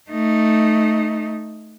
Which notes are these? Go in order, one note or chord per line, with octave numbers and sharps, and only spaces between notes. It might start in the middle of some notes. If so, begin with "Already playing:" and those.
A3 D#4